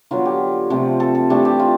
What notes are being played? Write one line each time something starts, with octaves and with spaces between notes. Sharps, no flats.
D3 F#3 B3 F4
G4
C3 F3 A3 C4
A4
A4
E3 A3 D4 G4
G4
F4